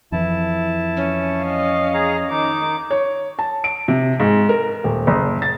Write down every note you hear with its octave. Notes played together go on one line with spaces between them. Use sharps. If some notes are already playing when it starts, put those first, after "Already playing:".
F2 E3 E4 A5
C#4
D#5 F5
G#4 A#5
D#3 D#4 D6
C#5
A5
D7
C3
G#2
A#4
D#1
F#1
A6